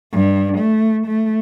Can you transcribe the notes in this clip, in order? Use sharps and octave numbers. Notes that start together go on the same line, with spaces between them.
G2
A3
A3